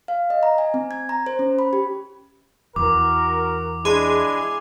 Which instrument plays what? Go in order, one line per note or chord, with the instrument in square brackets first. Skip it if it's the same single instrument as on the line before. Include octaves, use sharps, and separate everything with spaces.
[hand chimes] F5
D#5
A#5
G#5
C4
G#6
A#5
C5
C#4
B5
G4
[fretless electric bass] E2 E3 [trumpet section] F#4 A#4 [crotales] D6
[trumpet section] G#3 D4 E4 [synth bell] G#4 G#5 C6